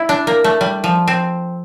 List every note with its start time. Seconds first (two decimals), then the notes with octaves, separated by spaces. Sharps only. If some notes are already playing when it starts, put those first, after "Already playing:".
Already playing: E4
0.09 D4
0.27 A#3
0.44 A3
0.61 G3
0.84 F3
1.08 C4